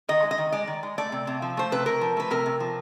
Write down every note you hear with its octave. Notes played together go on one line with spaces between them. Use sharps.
D#3 D#5
G#3
D#5
D#3
G#3 D5
D#3
G#3
A3 D5
C3
C3
F3
A3 C5
C3 B4
C3 A#4
F3
A3 B4
C3 A#4
C3
F3